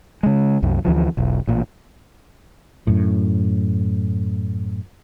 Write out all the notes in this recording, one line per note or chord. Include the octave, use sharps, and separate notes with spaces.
C#3 G#3
C2 F#2
D2 E3 F3
E1 B1
A1 A#2
F#2 A2